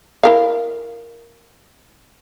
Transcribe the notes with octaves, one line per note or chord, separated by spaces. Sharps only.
E4 A#4 F5